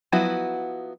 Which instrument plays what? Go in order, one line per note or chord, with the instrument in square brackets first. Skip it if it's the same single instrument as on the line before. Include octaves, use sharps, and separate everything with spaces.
[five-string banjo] F3 F#3 B3 E4 F#4